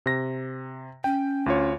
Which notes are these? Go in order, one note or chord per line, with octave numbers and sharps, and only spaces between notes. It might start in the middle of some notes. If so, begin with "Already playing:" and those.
C3 A#6
C#4 G5
D2 F4 C#5